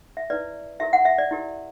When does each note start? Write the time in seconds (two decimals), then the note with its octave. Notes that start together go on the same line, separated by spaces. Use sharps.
0.17 E5
0.30 E4 B4 D5
0.80 E4 G4 A#4 E5
0.93 F#5
1.05 E5
1.18 D5
1.31 E4 G4 A#4